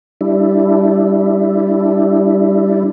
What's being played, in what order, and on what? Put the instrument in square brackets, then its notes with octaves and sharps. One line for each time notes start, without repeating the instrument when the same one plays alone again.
[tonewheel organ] G3 D4 E4